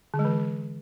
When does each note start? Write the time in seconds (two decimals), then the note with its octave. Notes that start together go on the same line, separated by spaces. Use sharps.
0.14 D3
0.19 G#3
0.25 E3